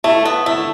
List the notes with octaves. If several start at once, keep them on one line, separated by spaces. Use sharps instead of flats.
A3 E4
B3
A3 E4